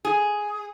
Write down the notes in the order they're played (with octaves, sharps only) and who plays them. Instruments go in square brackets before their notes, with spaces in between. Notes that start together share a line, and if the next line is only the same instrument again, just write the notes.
[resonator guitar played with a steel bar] G#4